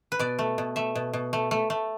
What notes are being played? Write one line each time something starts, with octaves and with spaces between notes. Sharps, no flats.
B4
B2 D5
A3
B2
A3 E5
B2
B2
A3
A3
A3